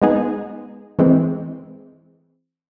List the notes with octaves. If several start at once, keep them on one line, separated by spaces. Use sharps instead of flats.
G#3 B3 D#4 G#4
E3 G#3 C4